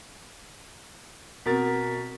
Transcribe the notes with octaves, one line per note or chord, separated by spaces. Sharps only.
B2 C4 A#4 A6 B6